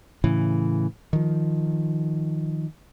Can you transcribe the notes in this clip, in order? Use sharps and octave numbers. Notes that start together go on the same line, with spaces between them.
A2 C#3 E3
D#3 F3